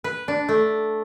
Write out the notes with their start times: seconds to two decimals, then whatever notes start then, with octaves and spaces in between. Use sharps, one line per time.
0.04 B4
0.28 D4
0.49 A3